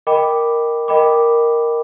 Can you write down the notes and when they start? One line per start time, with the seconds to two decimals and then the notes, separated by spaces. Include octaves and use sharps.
0.07 A#4 D#5 G5 B5 D6
0.88 A#4 D#5 G5 B5 D6